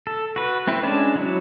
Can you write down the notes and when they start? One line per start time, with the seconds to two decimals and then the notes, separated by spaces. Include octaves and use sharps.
0.07 A4
0.36 F#4 B4
0.67 A3 C4 E4 B4
0.83 G#3 C#4 D4 G#5 A5
1.16 F#3 E4 F#4